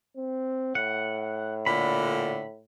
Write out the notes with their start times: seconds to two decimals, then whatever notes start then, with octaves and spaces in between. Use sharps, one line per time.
0.17 C4
0.75 A2 F#5
1.66 A#2 D3 B5